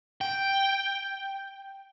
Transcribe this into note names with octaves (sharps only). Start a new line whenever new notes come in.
G5